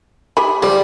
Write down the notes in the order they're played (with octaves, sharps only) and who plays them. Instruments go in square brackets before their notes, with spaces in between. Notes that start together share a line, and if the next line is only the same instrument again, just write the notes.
[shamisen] G4 G#5 B5
[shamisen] F3 G#3 [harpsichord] G3